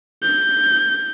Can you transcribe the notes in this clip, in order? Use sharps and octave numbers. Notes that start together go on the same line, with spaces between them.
G6